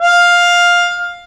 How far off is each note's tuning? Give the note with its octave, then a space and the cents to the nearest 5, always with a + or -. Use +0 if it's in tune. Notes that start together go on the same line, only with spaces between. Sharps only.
F5 +10